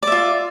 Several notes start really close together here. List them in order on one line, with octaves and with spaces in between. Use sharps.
D5 E5 F4